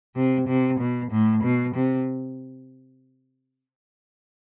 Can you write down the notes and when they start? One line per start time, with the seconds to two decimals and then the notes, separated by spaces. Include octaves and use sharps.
0.15 C3
0.48 C3
0.79 B2
1.11 A2
1.43 B2
1.75 C3